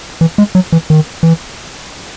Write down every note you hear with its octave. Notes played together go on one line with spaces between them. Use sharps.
E3
G#3
F#3
E3
D#3
E3